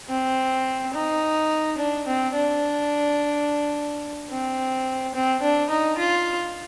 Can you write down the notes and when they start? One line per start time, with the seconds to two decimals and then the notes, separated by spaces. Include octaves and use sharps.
0.09 C4
0.94 D#4
1.79 D4
2.06 C4
2.35 D4
4.31 C4
5.15 C4
5.42 D4
5.70 D#4
5.98 F4